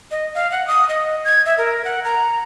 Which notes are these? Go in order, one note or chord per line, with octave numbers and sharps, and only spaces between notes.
D#5
F5
F#5
D#6
D#5
G#6
E5
A#4
F#5
A#5